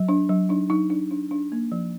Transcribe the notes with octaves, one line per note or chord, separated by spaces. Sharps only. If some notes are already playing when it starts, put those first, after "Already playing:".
Already playing: F#3
D4
F#3
D4 D#4
F#3 D#4
D4 D#4
D4
D4
A#3
F3